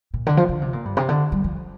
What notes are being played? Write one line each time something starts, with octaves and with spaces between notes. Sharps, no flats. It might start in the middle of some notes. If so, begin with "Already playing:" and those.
A#2
D3
F3
D3
C3
A#2
G2
C3
D3
G3
F3